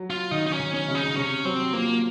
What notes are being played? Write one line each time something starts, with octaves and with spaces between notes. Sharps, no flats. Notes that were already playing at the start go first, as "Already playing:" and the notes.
Already playing: F#3
F4
D#3 D#4
D#4
C#4
D#3
C#4
C#3
D#4
C3 C#4
F#3 C4
F3 A#3